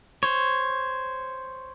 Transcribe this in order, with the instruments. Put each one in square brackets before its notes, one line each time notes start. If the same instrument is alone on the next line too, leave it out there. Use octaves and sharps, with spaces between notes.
[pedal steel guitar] C5 C#5